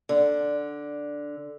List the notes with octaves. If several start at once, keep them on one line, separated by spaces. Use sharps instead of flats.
D3